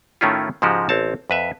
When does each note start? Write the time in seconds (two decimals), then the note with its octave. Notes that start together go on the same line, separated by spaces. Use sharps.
0.21 A2 D#3 A3 C#4 E4 F4
0.62 G#2 C#3 F3 G#3 F#4 G4
0.89 A1 C4 C#5 A5
1.30 F2 B4 E5